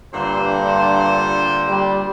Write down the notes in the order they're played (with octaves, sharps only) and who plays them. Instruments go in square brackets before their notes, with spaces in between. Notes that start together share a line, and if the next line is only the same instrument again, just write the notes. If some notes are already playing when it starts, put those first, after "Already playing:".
[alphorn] G2 [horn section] A#2 D3 C5
[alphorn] G3